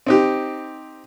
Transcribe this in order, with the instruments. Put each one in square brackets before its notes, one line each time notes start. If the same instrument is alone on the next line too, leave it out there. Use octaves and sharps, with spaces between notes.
[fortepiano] C4 D#4 G4